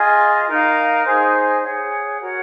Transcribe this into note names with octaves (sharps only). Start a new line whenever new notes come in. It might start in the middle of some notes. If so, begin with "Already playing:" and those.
Already playing: F4 G#4 D#5 G#5
D#4 A#4 F5
D#4 G#4 C5
G#4 C#5 F#5
F#4 A#4 C#5 F#5